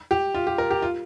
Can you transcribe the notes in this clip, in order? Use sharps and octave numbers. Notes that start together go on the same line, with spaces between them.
G4
F4
G4
A#4
G4
F4